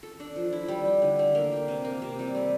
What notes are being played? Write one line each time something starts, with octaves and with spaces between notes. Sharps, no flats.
A4
D4
F3
E4
G3
G4
D3
A3
A#3
G4
C3
A#3
C3
G3
A3